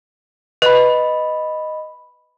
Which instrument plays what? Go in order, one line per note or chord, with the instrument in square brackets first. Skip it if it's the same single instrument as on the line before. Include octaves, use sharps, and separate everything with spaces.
[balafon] B4 [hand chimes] D#5 B5